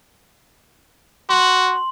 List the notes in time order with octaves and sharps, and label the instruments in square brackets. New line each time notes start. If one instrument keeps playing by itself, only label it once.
[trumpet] F#4 [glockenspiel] C6 F#7